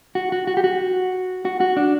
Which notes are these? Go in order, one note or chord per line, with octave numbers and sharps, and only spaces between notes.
F#4
F#4
F#4
G4
F#4
F#4
F#4
D4